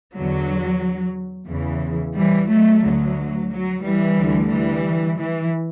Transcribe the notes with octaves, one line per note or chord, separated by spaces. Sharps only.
E2 D3 F#3
E2 C#3 E3
E3 G3
F#3 A3
D2 D3 F#3
F#3
E3 G3
D2 D3
E3 G3
E3